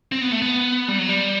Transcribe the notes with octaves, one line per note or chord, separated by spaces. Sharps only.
C4
B3
A3
B3
G3
F#3
G3